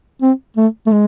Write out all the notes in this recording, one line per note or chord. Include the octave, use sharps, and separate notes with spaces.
C4
A3
A3
G#3